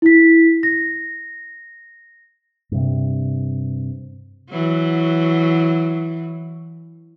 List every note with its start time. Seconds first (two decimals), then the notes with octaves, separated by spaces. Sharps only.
0.02 E4 B6
0.63 A#6
2.71 G2 C3
4.50 E3 F#3